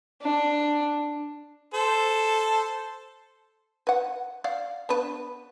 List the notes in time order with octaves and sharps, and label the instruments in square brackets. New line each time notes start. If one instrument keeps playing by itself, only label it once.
[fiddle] D4
[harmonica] A4 C5
[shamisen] B4 F#5
D5 F5 F#5
B3 D4 B4